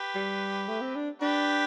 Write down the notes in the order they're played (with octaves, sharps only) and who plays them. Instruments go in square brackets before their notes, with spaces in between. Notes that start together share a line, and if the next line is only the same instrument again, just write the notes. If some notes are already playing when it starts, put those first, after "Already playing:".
Already playing: [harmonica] G4 B4
[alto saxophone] G3
A3
C4
D4
[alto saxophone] D4 [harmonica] G4 B4